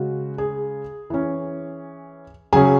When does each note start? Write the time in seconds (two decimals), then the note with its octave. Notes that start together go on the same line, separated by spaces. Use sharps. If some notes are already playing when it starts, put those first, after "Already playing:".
Already playing: C#3 G#3 C#4 F#4
0.38 G#4
1.10 E3 C#4
2.53 C#3 F#3 C#4 G#4 G#5